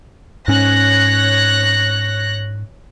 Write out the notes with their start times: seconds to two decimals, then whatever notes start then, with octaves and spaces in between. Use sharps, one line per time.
0.48 G#2 C#4 C#5 F#6 A#6